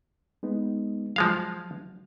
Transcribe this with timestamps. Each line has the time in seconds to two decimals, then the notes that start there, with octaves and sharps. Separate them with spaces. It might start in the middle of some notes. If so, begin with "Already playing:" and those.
0.43 G#3 B3 D#4
1.16 F3 F#3 G#3 F5